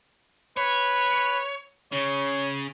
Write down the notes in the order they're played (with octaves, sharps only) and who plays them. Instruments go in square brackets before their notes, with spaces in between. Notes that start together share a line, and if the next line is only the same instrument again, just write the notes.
[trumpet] B4 [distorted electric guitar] C#5
[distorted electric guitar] C#3 [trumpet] C#5